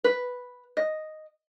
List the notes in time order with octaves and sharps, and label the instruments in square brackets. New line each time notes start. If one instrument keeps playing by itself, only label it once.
[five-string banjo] B4
D#5